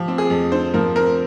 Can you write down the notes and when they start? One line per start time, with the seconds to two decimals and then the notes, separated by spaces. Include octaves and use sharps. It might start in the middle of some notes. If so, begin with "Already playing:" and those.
Already playing: F3 G4
0.08 C4
0.18 G#4
0.30 F2
0.52 D3 C5
0.74 F3 A#4
0.96 C4 A#4